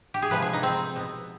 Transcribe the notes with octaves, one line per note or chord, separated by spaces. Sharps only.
G4
G#4
C3 F3 G#3 B4
G#4
D#4
C4
B2 B3